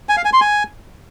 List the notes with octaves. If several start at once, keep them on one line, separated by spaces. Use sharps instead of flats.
G#5
F5
G#5
C6
G#5